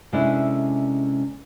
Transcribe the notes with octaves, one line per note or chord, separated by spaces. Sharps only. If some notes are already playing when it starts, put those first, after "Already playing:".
C3 G#3 C#4 D4 E4 A4